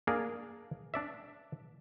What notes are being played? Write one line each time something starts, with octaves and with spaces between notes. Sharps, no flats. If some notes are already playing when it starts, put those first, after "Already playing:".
A#3 D4 G#4 A#4
D4 D5 E5